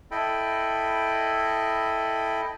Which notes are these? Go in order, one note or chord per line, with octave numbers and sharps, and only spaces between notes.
E4 A4 D#5 G5 B5